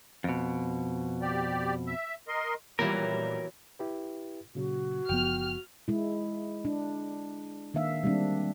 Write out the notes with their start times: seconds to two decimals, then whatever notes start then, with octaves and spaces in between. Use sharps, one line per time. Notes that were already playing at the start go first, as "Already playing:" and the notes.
0.24 F2 B2
1.22 G4 D5
1.87 E5
2.28 A#4 D#5 C6
2.79 A#2 E3 F#3 G3 B3 A#4
3.79 E4 G4 B4
4.55 A#2 C#3 F#3 F#4
5.09 F#1 F3 B3 G5 F6
5.88 G#3 E4
6.65 D4
7.74 D#3 A#3 D4 E5 F5
8.04 G3 G#3 A#3 C4 D4